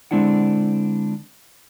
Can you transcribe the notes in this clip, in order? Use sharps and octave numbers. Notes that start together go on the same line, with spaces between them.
D3 G#3 C4 D4 E4 F#5